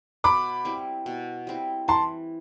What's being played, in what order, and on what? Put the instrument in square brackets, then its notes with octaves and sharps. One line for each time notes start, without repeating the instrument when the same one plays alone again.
[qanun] B2 [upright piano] B5 D6
[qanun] G3 C4 E4
B2
G3 C4 E4
[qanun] E3 [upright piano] A5 C6